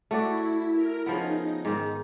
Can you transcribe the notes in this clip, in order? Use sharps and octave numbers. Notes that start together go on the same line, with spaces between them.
A3 E4 F#4 D5
A#4
C#3 F3 B3 D#4
G#2 D#3